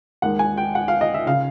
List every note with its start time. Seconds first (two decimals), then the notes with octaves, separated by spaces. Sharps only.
0.22 D#2 D#3 G#3 F#5
0.39 G#5
0.57 G5
0.75 F#5
0.88 F5
1.01 D#5
1.14 E5
1.27 C#3 F5